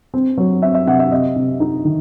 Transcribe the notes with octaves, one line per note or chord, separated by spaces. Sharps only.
C4
F#3
C4 E5
E5
C3 F#5
E5
C3 D#5
C3
D#4
D#3